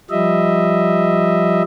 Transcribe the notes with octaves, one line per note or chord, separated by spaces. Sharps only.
F3 G3 D#5 E5